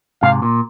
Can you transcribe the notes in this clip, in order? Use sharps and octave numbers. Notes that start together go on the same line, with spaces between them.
G#2 C3 F5
A#2